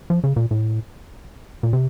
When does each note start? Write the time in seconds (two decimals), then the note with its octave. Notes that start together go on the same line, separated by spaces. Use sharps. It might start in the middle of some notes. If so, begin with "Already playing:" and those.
0.10 F3
0.24 C#3
0.36 A#2
0.51 A2
1.63 A#2
1.73 C3